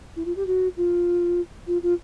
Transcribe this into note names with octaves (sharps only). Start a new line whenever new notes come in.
E4
F4
G4
F#4
F4
F4
F4